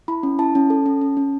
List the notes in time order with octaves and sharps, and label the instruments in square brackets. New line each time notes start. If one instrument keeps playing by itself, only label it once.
[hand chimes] E4 B5
C#4
E4 A5
C#4
A4
C#4
C#4
C#4